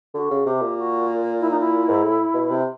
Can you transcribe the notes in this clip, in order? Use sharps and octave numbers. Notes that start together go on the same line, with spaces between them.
D3 F#4
C#3
C3 G4
A#2
F#4
E4
D#4
E4
G#2
A2
B2
C3